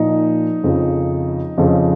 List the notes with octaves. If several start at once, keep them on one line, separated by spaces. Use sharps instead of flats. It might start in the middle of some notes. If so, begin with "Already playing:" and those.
Already playing: A#2 F3 D#4
F2 C#3 F3
F2 C#3 F3